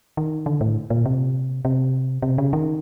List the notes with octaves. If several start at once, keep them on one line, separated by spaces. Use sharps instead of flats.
D#3
D3
A2
A#2
C3
C3
C3
C#3
D#3